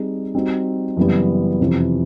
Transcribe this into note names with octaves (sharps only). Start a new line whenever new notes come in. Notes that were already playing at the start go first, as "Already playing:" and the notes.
Already playing: G3 C4 D#4 G#4
G3 C4 D#4 F#4
F#2 C#3 E3 G3 B3
F2 C3 E3